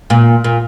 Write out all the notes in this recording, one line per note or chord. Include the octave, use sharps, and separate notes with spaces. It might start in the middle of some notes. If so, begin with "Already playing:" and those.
A#2
A#2